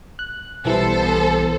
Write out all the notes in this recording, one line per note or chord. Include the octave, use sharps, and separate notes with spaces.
F#6
B1 E3 G3 B3 A4 C5